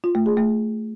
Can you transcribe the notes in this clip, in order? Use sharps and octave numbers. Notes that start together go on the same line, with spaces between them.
F4
A3
G#4
A3